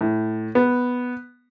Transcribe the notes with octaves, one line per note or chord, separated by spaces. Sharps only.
A2
B3